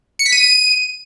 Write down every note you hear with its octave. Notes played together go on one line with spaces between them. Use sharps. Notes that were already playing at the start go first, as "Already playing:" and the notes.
C#7
B6
D#7